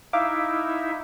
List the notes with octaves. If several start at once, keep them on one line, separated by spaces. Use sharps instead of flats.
D#4 E4 E5 F5 D6